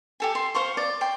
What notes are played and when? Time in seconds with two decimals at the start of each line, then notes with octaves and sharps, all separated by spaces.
0.20 G4 A4 G#5
0.35 C6
0.55 C5 F5 C6 C#6
0.77 D5
1.01 G5 C6